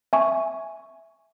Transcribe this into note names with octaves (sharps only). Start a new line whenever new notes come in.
E5 G#5 C#6